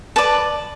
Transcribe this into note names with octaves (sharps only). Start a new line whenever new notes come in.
B4 D5 A5